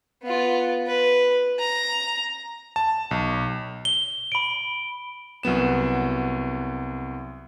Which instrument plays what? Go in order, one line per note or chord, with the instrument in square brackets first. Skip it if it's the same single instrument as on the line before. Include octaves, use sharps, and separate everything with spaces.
[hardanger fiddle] B3 F4
B4
A#5
[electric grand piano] A5
B1
[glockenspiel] G7
B5 D7
[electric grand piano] C2 F#3 B3 E7